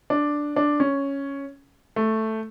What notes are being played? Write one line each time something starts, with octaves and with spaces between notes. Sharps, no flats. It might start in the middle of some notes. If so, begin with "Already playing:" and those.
D4
D4
C#4
A3